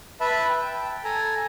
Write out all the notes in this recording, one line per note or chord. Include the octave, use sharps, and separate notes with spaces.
B4 E5 A5 B5
G5
A4 G#5 A#5